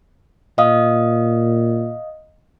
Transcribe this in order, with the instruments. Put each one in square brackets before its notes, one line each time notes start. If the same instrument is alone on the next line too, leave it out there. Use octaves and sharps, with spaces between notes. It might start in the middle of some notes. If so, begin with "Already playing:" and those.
[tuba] A#2 [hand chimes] D#5 F5 D#6